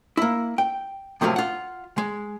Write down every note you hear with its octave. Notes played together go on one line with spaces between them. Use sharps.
A#3 E4
G5
A2 C3 F3 F#3 G#3 A#3
F4 F#5
G#3